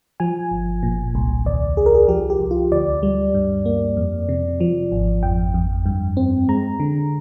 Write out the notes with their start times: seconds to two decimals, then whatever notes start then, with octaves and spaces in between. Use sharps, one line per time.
0.20 F3 G#5
0.51 G1
0.83 A#2
1.15 C2
1.46 D#2 D5
1.77 D#2 G#4
1.86 A#4
1.94 G#4
2.08 F3 G4
2.30 G4
2.40 C2
2.51 F4
2.72 D2 D5
3.03 G3
3.34 G2
3.66 A#3
3.97 F2
4.29 C3
4.60 F3
4.92 G#1
5.23 F2 G5
5.54 F2
5.86 G2
6.17 C4
6.49 G#3 A#5
6.80 D3